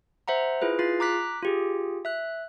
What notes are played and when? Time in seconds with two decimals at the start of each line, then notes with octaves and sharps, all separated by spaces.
0.28 C5 E5 F#5 A#5
0.62 E4 F4 G#4 B4
0.79 F4 G#4 A6 C7
1.00 A#5 D6 F#6 B6
1.43 F4 G4 G#4
2.05 E5 F#6